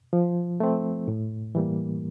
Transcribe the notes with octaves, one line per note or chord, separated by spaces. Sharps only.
F3
A3 C4
A2
E3 G3 A#3